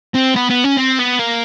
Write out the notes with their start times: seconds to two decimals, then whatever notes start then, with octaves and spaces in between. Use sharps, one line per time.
0.15 C4
0.36 B3
0.50 B3
0.64 C#4
0.77 C4
0.99 B3
1.19 A#3